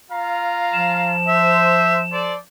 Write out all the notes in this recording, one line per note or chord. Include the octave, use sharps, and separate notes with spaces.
F4 F5 A#5
F3 E7
C5 E5
A4 C5 D5